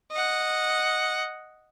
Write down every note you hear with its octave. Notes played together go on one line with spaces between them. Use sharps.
D#5 F#5